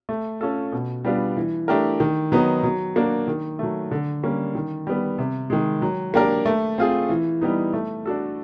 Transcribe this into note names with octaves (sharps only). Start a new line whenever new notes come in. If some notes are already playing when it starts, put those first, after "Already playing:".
A3
C#4 F4 A4
B2
G3 B3 D4 F4
E3
A3 D4 G4 A#4
D#3
F#3 B3 D#4
F#3
A#3 D4 F#4
D#3
F#3 A3
D3
G3 A#3 C#4
D#3
G3 B3
C3
D#3 G#3
F#3
A#3 D4 G4 A#4
A3
C4 F4 G#4
E3
G3 B3 D#4
A3
D4 F#4 A4